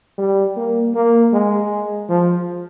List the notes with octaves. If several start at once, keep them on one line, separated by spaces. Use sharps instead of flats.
G3
A#3
A#3
G#3
F3